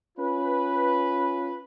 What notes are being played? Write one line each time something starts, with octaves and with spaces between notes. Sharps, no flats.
C#4 F4 B4